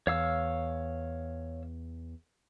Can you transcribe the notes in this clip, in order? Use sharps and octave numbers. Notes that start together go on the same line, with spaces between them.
E2 C#5 F5 E6